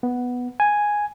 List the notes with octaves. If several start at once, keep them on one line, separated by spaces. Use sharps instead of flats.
B3
G#5